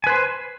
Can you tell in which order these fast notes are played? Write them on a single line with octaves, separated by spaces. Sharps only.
G#5 B4 C5